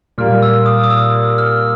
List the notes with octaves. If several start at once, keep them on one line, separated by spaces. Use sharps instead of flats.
A#2 G3 A#3 F6
E6
D#6
D#6
E6
F6